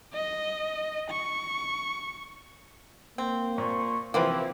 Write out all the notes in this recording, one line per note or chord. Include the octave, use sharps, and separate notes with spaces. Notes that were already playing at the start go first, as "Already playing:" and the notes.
D#5
C#6
A#3 C4
A#2 C5 C#6
C3 E3 F3 A#3 C4 E4 B4